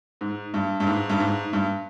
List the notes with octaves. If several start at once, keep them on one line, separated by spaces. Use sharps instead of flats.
G#2
G2
G2
G#2
G2
G#2
G2